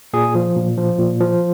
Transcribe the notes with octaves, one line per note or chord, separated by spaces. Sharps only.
A#2 G#4
F3
A#2
F3
A#2
F3